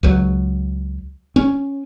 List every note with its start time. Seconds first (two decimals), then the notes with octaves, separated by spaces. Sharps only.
0.03 C#2 F#3
1.36 C#4